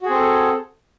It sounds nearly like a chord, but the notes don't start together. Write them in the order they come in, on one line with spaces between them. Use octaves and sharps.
F#4 G#4 C4 A4